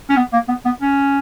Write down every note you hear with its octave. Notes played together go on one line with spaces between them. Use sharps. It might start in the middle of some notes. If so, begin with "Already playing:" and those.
C#4
B3
A#3
B3
B3
C#4